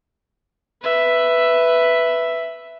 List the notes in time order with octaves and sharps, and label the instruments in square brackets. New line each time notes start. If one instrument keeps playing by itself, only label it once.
[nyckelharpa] B4 E5